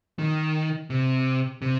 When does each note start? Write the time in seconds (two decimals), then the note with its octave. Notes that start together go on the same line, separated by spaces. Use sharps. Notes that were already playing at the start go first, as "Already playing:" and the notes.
0.19 D#3
0.90 C3
1.62 C3